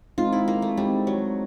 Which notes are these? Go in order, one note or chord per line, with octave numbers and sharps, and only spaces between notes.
G#3 C4 D#4 F4
E4
A#3
A3
G3 G#3 C4 D#4
F#3